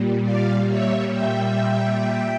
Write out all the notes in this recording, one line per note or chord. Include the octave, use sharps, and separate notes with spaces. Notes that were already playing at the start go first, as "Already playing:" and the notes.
Already playing: A#2 G3
D5 F5
C#5 E5
E5 G5